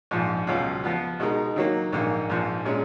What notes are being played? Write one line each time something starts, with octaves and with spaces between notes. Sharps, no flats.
A#1 G#2 F3
C#2 B2 F#3 C#4 F4
F3 B3 F4
B2 G#3 D#4 A#4
D#3 F#3 A#3
A#1 G#2 D#3 A#3
A#1 G#2 F3
A#2 G#3 C#4